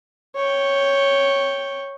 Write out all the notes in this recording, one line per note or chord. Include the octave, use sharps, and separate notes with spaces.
C#5 G5